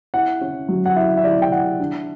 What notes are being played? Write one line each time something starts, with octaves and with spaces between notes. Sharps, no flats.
E4 F#5
C#4
F#3
F#5
E4 E5
E5
E4 D5
G5
E4 F#5
D4